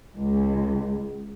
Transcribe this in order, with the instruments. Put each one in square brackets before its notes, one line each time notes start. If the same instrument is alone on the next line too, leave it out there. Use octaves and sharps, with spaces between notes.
[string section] C#2